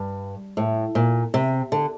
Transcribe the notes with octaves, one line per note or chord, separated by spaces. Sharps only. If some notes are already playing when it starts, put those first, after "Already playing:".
Already playing: G2
A2
A#2
C3
D3